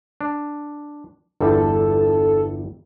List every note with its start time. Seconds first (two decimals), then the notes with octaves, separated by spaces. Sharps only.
0.21 D4
1.41 G1 E2 G3 A4